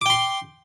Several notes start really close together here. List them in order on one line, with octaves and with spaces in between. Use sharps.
D6 G5 C6